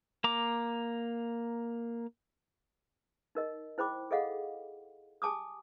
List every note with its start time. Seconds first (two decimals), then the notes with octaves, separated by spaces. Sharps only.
0.24 A#3 A#5 D6
3.35 D#4 A#4 D#5
3.78 E4 C5 G5 B5 D6
4.11 G#4 A4 D#5 F5 F#5
5.22 G4 G#5 A5 D6 D#6